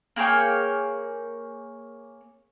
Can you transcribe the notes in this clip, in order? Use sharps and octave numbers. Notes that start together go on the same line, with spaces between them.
A#3 G#4 C#5 G5